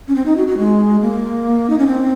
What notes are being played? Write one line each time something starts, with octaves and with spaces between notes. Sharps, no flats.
C#4
C4
D#4
F#4
F#4
G#3
A#3
D#4
C#4
C4